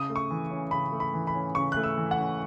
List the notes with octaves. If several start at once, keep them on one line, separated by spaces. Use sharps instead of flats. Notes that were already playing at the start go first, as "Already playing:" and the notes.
Already playing: C#3 D#6
A3
C#6
E3
C#4
C#3 B5
A3
B5
E3
B5
C#4
C#3 C#6
A3 F#6
E6
E3
F#5
C#4